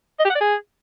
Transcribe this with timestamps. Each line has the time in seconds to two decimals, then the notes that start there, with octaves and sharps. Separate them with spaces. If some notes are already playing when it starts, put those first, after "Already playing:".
0.20 D#5
0.25 G4
0.30 F#5
0.35 D5
0.40 G#4